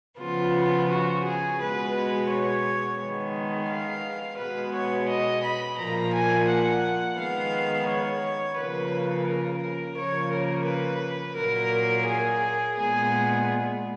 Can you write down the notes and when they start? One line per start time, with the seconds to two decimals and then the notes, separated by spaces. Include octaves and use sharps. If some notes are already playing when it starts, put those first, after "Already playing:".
0.20 C#3 F3 B3 F4
0.89 F#4
1.24 G#4
1.59 B2 G#3 B3 B4
2.29 C#5
2.98 D#3 G#3 B3
3.68 F5
4.38 B2 G#3 B3 B4
4.73 C#5
5.09 D#5
5.43 B5
5.77 A#2 F3 A#3 A#5
6.13 G#5
6.47 F#5
7.17 D#3 G#3 B3 F5
7.87 C#5
8.57 C#3 F3 A#3 B4
9.27 A#4
9.61 A#4
9.96 C#3 F3 A#3 C#5
10.31 A#4
10.65 B4
11.35 A#2 F#3 A#3 A#4
12.05 G#4
12.75 A#2 G#3 B3 G#4